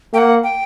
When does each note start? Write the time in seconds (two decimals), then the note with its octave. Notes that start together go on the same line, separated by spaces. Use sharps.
0.13 A#3 G5
0.18 F#5
0.43 G5